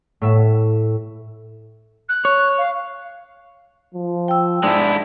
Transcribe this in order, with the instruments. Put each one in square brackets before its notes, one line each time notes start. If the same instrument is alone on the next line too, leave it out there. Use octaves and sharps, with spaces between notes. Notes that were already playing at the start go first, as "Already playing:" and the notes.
[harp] A2 E5
[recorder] F#6
[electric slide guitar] C#5
[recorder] F5
[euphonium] F3
[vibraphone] G5 E6
[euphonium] G#2 [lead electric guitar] G#3 E4 [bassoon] D4